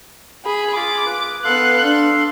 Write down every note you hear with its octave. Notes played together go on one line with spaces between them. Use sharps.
G#4 B5
F4 G#4 B5 D6
B4
B3 A4 F5 C6 F#6
D4